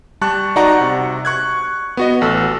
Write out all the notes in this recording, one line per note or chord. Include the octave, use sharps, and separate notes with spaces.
G3 A5 C#6 F#6
D#4 F#4 D5 F#5 A#5 C#6
C3
C#6 F#6 G#6
B3 F#4 D#5
A1 A4 E6